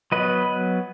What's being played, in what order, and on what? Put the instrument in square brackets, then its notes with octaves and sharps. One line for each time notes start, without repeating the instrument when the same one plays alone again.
[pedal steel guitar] F#3 B3 B4 D#5